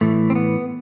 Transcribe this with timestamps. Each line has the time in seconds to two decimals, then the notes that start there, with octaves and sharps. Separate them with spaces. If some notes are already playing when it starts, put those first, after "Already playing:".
0.01 A2 E3 A3
0.30 C4
0.35 B3